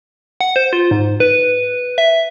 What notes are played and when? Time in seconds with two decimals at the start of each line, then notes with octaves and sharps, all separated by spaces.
0.41 F#5
0.56 C5
0.73 F4
0.91 G#2
1.20 B4
1.98 E5